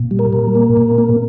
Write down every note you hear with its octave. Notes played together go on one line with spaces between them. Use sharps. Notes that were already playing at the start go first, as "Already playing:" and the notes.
Already playing: A#2
G3
A#4
A#2
A#3
A#2
A#3